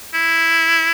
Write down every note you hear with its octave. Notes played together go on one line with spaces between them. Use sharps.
E4